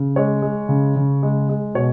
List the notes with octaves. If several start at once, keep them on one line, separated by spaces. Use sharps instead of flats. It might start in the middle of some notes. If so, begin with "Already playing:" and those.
Already playing: C#3
G#3 C#5
G#3
C#3
C#3
G#3
G#3
B2 C#5